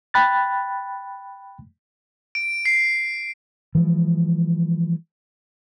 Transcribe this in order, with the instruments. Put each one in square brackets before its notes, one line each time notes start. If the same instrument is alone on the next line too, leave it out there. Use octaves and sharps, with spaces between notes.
[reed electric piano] G5 B5 F#6 A6
[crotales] D7
C7
[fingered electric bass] E3 F3 G#3